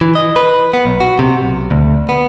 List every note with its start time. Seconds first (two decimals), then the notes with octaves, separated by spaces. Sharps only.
0.01 E3
0.15 D#5
0.36 B4
0.74 B3
0.85 B1
1.00 F#4
1.19 C3
1.42 B1
1.71 D2
2.09 B3